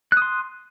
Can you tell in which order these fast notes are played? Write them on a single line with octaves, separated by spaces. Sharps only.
F#6 D#6 C6